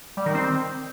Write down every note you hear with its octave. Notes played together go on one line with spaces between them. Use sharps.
G3
D#3
C4